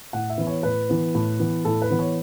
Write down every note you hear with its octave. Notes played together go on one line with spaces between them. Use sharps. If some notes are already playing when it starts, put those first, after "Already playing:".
A2 F#5
E5
E3 B3
C#5
A2 B4
E3 B3
A2
E3 B3
A2 A4
B4
E3 B3
C#5